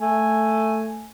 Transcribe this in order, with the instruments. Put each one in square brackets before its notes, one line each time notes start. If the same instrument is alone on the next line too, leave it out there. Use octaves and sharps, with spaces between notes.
[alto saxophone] A3 [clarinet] G#5